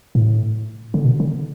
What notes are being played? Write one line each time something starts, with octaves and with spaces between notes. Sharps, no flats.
A2
D3
B2
D3